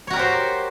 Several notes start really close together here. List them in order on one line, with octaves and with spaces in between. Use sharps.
C#5 F#4 A#4 G4 C5